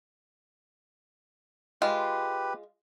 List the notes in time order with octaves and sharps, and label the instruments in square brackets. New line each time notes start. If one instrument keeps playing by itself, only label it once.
[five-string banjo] G#3 F4 [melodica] G4 B4